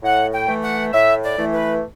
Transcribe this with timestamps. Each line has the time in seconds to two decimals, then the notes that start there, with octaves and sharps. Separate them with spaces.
0.03 A2 F#5
0.33 G5
0.48 E3 A3
0.63 F#5
0.93 A2 E5
1.23 D5
1.38 E3 A3
1.52 B4